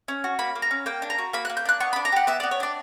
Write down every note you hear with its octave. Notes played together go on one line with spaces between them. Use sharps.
C#4
F#4
A#3 B5
A#3
A#5
C#4
A#3 G5
D4
A#5
F#4
A#3 B5
F#6
A#3
G6
D4 F#6
B3 C#6
D4 B5
A#5
G4 F#5
B3 E5
D5
B3
C#5
D4 D5